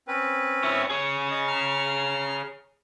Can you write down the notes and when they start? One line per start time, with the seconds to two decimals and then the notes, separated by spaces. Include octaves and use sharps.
0.08 C4 C#4 B4
0.63 C#5 E5
0.90 G#4 C#5
1.31 D#5
1.48 A#5 F6